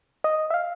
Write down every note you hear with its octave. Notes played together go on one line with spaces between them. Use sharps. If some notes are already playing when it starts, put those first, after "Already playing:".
D#5
E5
F5